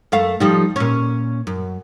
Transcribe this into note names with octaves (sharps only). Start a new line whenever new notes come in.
F#2 A3 F5
F3 G3 D#4
A#2 C#4
F#2